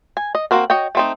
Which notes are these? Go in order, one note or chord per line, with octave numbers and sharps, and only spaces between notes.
G#5
D#5
A#3 C4 F#4 A#4
F#4 C#5 D#5 G5
A3 C4 D#4